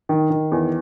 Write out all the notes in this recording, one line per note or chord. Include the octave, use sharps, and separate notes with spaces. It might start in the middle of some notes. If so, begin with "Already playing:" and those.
D#3
D#3
E2